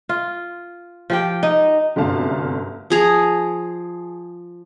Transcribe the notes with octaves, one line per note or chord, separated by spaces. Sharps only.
F4
F3 G4 G5
D#4
G1 C2 F#2 A3 F5 A5
F3 G#4 A#5